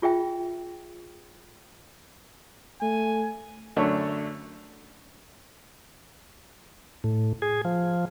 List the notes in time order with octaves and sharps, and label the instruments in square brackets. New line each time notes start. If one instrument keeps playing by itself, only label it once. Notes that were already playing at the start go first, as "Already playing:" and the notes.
[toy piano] F4 G#4 E5 G5
[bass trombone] A3 [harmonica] G#5
[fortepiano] F#2 D3 A3 D4 C#5
[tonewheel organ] A2
G#4
F3